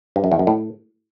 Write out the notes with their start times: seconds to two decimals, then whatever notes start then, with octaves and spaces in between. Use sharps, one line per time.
0.16 G2
0.24 F#2
0.32 E2
0.39 F#2
0.47 A2